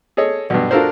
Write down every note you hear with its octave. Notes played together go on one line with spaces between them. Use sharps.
G#4 A4 C#5 D#5
B1 G2
D4 F4 F#4 A4 A#4 C5